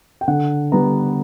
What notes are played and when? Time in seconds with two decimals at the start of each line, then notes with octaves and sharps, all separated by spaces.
0.21 G5
0.28 D3 F#5
0.72 G3 B3 A#5